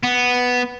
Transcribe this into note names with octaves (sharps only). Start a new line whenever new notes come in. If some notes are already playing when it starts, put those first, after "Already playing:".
B3